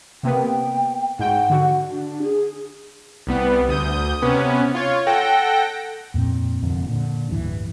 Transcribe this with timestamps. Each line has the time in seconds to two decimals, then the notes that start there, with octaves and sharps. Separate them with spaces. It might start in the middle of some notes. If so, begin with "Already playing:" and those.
0.23 C3 A#3 B3 G5
1.19 G#2 F#5 G5
1.50 D3 F#4
1.90 D4
2.23 G#4
3.27 C2 G3 B3
3.69 D2 D#6 G6
4.22 C3 B3 C#4
4.75 F4 C#5
5.07 A4 F#5 G5 A#6
6.14 F2 A#2 A#3 C4
6.63 F1 F2 A#2 D3
6.89 A#2 D3
7.30 D1 G2 E3